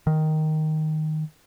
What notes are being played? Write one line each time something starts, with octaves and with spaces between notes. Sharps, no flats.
D#3